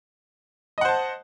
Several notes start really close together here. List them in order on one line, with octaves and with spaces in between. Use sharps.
D#5 F#5 C5 A5